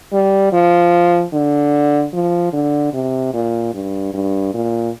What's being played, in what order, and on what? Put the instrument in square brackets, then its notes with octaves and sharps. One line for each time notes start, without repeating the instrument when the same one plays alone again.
[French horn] G3
F3
D3
F3
D3
C3
A#2
G2
G2
A#2